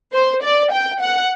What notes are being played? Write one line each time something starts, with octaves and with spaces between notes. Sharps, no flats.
C5
D5
G5
F#5